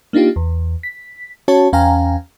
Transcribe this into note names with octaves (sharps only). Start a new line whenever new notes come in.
A#3 D4 D#4 F4 G4
E2
B6
C#4 F#4 C#5 A5
E2 C#4 F5 G5 G#5 A#5